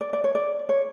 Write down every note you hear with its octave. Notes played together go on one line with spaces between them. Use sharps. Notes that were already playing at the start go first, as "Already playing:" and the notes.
D5
D5
C#5
D5
C#5